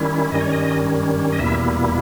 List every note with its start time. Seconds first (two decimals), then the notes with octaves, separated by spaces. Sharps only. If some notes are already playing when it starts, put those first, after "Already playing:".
Already playing: D#3 G3 C#4 E4
0.31 G2 D#3 G3 C#4 D#5
0.41 C#5
0.52 D#5
1.33 D#5
1.39 E2 B2 G3 A#3 E4 E5